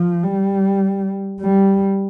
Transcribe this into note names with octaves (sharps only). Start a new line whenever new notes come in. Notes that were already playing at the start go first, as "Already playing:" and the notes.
Already playing: F3
G3
G3